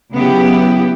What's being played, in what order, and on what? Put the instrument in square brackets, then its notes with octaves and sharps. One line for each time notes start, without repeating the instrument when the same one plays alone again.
[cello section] C#3 F#3 B3 E4 G4